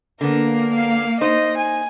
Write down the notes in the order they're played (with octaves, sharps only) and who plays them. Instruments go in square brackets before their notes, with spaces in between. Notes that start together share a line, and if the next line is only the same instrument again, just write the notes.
[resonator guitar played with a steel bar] D3 B3 [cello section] A#3 [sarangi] A#4
[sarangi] F5
[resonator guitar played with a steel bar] D#4 C5 [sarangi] D#5
[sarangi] G#5